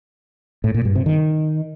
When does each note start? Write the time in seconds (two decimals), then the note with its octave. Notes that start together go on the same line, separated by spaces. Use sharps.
0.64 A2
0.74 A#2
0.85 G2
0.95 C3
1.06 D#3